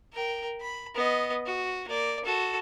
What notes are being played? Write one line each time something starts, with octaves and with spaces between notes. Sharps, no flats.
A#4 G5
B5
B3 D#5
F#4
A#3 D5
F#4 A4